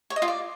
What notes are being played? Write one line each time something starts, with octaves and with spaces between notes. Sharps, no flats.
C#5
D#5
F4
D5